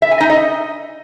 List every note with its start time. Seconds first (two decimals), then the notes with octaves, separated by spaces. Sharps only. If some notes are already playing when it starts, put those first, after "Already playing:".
0.02 E5
0.11 G#5
0.20 D#4
0.30 D#5